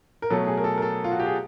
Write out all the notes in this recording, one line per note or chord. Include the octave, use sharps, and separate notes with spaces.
A#4
B2 F#3 A3 A4
G#4
A#4
A4
A#4
A4
F4
F#4
G4
G#4